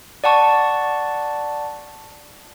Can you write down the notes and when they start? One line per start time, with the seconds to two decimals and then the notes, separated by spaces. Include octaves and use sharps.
0.24 D5 F#5 A5 C#6